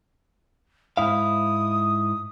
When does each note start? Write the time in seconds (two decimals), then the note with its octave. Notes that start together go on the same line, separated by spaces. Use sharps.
0.97 G#2 E4 F5 D#6